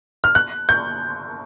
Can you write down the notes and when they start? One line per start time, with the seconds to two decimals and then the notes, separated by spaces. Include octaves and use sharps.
0.24 F6
0.35 F#6
0.69 G6